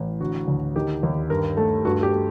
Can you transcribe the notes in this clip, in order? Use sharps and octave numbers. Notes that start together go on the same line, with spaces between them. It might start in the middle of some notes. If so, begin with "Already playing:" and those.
Already playing: A1 A2
D3 F#4
D2
D#3 G4
D#2
G2 A#4
A3 A4
G2 F#4
G4
A3